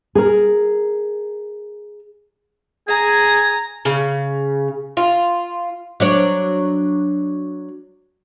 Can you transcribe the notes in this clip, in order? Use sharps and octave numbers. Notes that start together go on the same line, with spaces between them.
G#4 A#4
G#4 G#5 A#5
C#3
F4
F#3 D4 C#5